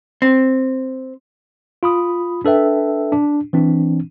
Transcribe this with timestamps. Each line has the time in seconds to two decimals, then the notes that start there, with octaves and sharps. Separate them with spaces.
0.22 C4
1.83 F4 B5 D#6
2.45 D4 A4 B4 E5 G5
3.12 D4
3.53 E3 C4 D4